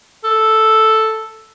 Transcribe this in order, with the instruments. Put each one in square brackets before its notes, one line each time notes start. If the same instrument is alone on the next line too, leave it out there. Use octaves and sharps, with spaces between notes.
[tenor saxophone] A4